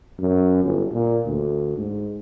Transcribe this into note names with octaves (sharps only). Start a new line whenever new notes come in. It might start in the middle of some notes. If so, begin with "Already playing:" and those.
F#2
G1
A#2
D2
G#2